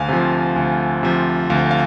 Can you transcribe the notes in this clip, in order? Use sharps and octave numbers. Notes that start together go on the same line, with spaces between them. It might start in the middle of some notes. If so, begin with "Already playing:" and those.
Already playing: D2 F5 G#5
C3 F3
D2
C3 F3
D2 F5
F5